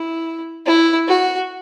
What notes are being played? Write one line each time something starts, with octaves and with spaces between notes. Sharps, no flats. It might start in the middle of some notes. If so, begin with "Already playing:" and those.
Already playing: E4
E4
F#4